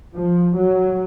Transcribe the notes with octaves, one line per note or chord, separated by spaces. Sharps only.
F3
F#3